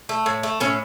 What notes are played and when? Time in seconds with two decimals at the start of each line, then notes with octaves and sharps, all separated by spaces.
0.09 A3
0.26 A2
0.43 A3
0.60 A2 C#4